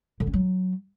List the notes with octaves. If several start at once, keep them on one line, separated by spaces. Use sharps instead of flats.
D3
C#4
F#3